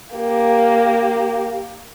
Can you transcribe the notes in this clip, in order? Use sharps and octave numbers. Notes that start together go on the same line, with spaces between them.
A#3 G4